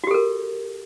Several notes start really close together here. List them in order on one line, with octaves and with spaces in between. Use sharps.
F#4 G4 A4 A#4